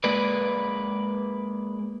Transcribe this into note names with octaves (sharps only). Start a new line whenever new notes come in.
G#3 A#3 B4 D5